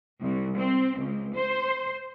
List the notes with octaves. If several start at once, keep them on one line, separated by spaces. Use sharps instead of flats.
C2
C4
C#2
C5